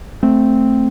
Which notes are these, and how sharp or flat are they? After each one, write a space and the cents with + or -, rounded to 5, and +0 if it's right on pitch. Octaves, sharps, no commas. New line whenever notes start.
A3 +0 C4 +0